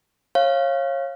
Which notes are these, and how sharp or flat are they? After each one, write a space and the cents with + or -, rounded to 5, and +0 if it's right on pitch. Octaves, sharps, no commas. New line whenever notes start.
C#5 -25 F5 -10